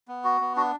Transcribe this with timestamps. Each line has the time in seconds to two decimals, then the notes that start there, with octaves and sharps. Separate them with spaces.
0.08 B3
0.24 F#4
0.41 B3
0.56 D4 F#4